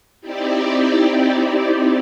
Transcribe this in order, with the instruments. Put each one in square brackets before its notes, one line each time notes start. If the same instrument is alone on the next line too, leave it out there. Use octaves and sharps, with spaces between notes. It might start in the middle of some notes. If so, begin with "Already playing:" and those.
[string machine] C4 D#4 E4 G4 D5